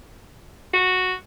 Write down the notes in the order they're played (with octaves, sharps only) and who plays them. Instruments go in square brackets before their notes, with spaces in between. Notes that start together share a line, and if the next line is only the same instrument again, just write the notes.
[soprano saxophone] F#4